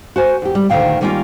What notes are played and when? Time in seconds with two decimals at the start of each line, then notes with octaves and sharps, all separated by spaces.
0.16 F#4 C5 G#5
0.42 E2 G4
0.55 G3
0.70 D2 A#2 D#3 F5 G5
1.01 D#3 G3 A#3 C#4 D#4 F4